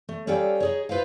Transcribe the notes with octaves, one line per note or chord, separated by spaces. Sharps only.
A3
G3 C#4 A4 D5 F5 G5
D#4 G#4 C#5
F4 B4 C5 E5 F5